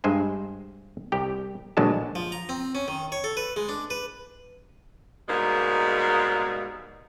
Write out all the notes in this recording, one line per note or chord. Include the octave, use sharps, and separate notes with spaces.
G2 G#3 C5 G#5
C2 G4 G5
A#1 D3 F#3 G#3 A5
F3
A#5
C4
C#4
D#3
C#5
A4
B4
G#3
D4
B4
G#2 B2 G3 G#3 A#3